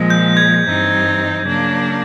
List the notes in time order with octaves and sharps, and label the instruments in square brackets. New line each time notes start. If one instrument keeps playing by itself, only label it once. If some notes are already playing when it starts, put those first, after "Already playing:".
Already playing: [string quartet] A#2 F3 G#3
[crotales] G6
G#6
[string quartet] G2 E3 G3 C4 D#4
C#3 F#3 A#3 D4